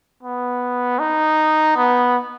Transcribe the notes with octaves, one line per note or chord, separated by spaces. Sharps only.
B3
D#4
B3